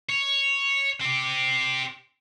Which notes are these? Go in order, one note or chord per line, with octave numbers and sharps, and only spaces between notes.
C#5
C4 G4